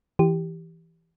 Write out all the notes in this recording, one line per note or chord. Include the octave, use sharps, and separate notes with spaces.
E3 G4